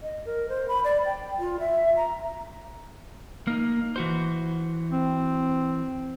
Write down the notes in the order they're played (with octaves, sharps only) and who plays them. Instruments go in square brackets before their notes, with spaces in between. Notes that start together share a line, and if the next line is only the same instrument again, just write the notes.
[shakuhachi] D#5
A#4
C5
B5
D5
G5
F4
E5
A#5
[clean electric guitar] A#3 D#4
E3 F#4 C5
[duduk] C4